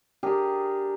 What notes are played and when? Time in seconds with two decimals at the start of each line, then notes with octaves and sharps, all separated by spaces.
0.23 D4 G4 G#4 A#4